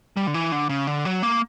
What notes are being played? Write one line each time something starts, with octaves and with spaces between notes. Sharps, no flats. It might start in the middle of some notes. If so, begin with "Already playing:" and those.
G3
D3
E3
D3
C#3
D3
F#3
A#3